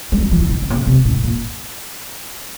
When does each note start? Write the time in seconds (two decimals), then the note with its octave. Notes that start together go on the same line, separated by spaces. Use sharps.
0.12 G3
0.21 F#3
0.31 F3
0.40 E3
0.49 D#3
0.62 D3
0.70 C3
0.74 C#3
0.87 C3
1.05 A2
1.24 A#2